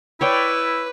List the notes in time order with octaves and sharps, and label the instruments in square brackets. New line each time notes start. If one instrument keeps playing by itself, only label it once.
[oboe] E4 [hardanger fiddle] B4 [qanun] C#5 D5 G5